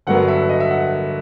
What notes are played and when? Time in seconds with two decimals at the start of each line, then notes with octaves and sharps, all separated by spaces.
0.07 G1 G2 F#3 B3 F#5
0.28 E5
0.49 D#5
0.60 E5
0.71 F#5
0.81 F#5